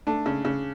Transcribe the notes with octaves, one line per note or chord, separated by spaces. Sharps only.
A3 D4
C#3
C#3